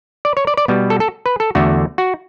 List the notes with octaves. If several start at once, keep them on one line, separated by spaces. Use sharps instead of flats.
D5
C#5
D5
D5
B2 G3 B3
A4
A4
B4
A4
E2 D3 A3 F#4
F#4